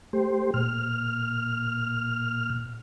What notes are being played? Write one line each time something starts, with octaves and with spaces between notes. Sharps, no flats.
A3 G4 C5
A#2 F6